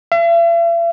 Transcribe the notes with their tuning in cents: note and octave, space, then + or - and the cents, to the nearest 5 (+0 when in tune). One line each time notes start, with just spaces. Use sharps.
E5 +45